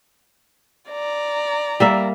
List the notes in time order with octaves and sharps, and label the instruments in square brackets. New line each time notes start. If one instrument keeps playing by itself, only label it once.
[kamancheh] D5 A#5
[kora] G3 A#3 E5